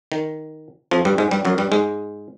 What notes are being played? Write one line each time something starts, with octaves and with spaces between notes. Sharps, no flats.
D#3
F2 F3
G2 G3
G#2 G#3
G2 G3
F#2 F#3
G2 G3
G#2 G#3